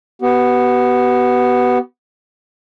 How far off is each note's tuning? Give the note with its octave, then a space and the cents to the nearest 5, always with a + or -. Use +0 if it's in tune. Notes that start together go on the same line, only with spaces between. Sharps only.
B3 +0 G4 -45